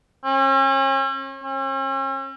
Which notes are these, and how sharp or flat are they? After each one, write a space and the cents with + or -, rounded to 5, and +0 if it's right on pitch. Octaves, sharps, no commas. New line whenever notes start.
C#4 -40
C#4 -45